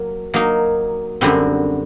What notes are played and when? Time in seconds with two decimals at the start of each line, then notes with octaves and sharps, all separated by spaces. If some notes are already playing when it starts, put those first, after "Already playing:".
Already playing: F#3 A#3
0.34 F#3 A#3 D#4
1.21 F#2 D3 G3 C4 F#4